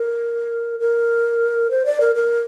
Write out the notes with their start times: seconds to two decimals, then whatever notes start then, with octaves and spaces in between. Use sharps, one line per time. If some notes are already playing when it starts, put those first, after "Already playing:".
Already playing: A#4
0.80 A#4
1.71 C5
1.86 D5
2.00 A#4
2.16 A#4